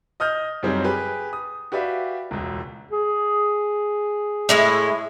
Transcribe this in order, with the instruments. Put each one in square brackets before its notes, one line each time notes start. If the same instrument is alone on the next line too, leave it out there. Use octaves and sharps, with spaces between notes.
[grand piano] D#5 D#6 F6 G6
F#2 C#3 F#3 G3 C4 D#4
G4 G#4 B4
D#6
F#4 G4 B4 D5 E5 F5
E1 C#2
[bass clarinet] G#4
[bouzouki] A2 G#3 E4